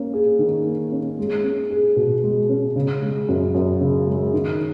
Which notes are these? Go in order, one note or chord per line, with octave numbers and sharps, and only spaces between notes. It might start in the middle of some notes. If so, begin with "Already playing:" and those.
Already playing: A#3 C#4
G#4
D#3
A#3
C#4
G#3
C#4
G#4
B2
G#3
C#4
C#3
G#3
F#2
F#2
C#3
G#3
D#3